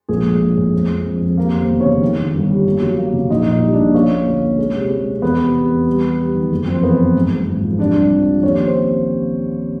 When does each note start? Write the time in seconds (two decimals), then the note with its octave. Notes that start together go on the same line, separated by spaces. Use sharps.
0.09 A#1 G#3 G#4
0.24 A3
0.41 A#1
0.57 A2
0.73 F2
0.89 F2
1.06 F2
1.21 F2
1.37 D#2 A#3 A#4
1.54 D#2
1.59 C4 C5
1.69 E1
1.80 C#4 C#5
1.86 C#3
2.02 D#3
2.18 D#3
2.34 G1
2.50 G3
2.66 A#3
2.82 F#3
2.98 A#3
3.13 C#3
3.30 A#1 D#4 D#5
3.46 A#2
3.51 D#4 D#5
3.62 G3
3.73 D4 D5
3.78 A#1
3.94 A#3 C#4 C#5
4.10 A#3
4.26 D2
4.43 A#3
4.59 G#3
4.75 C3
4.91 G#3
5.07 C3
5.22 E2 B3 B4
5.39 C3
5.55 C3
5.71 E2
5.87 G3
6.03 G3
6.19 G3
6.35 D#3
6.52 F#1
6.67 F2 C4 C5
6.83 E3 B3 B4
6.99 F#1
7.15 G#2
7.31 G#2
7.47 G#1
7.63 F3
7.79 C3 D4 D5
7.96 C2
8.12 F3
8.28 F3
8.43 D#2 C#4 C#5
8.65 C4 C5